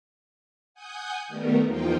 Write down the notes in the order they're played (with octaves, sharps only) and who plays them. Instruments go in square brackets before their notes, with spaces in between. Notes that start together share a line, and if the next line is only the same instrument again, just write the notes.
[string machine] F#5 G#5 D#6 G6
D#3 G3 A3 B3 A#4
E2 F3 A#3 D#4 F4 G5